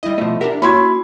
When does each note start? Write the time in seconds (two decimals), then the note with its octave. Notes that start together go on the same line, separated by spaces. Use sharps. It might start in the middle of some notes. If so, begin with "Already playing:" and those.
0.03 G3 E4 D#5
0.18 B2 F3 A3 D#5
0.41 D4 G4 A#4 E5 F#5
0.62 A#3 C#4 E4 F#4 B5 C6 G#6